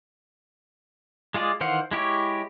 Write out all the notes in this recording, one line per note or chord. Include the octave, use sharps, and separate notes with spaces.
G#3 F4 G#4 D5
D#3 E3 C5 F5 F#5
G#3 E4 G4 C#5